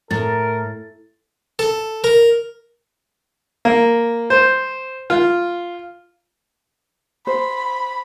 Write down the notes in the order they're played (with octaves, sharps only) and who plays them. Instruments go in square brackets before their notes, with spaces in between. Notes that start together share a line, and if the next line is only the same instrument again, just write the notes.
[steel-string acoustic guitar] A2 [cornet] A#4 [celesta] A6
[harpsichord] A4
A#4
[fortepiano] A#3
C5
F4
[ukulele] C5 [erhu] B5